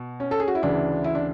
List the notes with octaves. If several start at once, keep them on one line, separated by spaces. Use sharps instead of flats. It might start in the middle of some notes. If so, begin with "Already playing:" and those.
Already playing: B2
C#4
A4
G#4
F#4
E4
D2 C#3 E3 D4
E4
D4